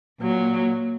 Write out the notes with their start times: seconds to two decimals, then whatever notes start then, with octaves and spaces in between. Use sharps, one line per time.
0.20 A#2 F#3